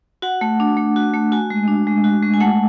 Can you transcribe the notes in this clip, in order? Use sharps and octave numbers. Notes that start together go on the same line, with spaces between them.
F#4 F#5
A3
D4
A3
F#4
A3
F#4 G#5
G#3
D4
G#3
F#4
G#3
G#5
A3 F#5